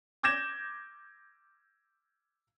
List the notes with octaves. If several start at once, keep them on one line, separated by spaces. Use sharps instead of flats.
D6 G6 G#6 A#6 E7